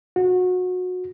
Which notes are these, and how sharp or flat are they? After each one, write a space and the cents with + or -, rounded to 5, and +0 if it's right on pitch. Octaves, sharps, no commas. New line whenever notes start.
F#4 -25